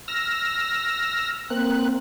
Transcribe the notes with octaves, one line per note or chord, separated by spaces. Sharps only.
E6 F6 A#6
A#3 C4 F#6